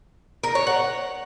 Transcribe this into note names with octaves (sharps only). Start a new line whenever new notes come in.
A#4
C#5
F#5